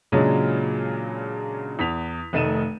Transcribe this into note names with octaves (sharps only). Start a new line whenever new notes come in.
A#2 C#3 F#3 G#3 D4
E2 B6 F7
F1 D#3 A3 D#4 D#7 E7